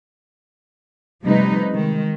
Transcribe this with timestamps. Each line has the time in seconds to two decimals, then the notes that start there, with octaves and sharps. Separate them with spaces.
1.23 C3 F3 G3 A3 D#4 B4
1.72 D#3 G#3